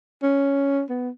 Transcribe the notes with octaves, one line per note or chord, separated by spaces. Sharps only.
C#4
B3